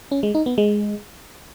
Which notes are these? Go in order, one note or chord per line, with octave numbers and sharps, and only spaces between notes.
C#4
G#3
D#4
B3
G#3